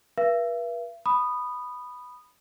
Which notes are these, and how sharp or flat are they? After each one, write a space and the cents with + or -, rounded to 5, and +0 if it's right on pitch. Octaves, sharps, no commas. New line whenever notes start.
B4 -40 E5 +45
B5 +0 D#6 -15